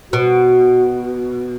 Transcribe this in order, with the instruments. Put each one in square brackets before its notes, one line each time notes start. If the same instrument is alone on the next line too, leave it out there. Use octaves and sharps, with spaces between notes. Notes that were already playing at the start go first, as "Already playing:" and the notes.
[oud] B2 [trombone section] F#4